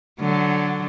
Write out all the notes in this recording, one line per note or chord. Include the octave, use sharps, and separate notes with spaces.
D3 F#3